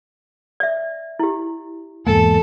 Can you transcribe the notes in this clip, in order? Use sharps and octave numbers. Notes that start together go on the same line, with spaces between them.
D5 E5
E4 G4
E2 G#2 A#3 A4 G#5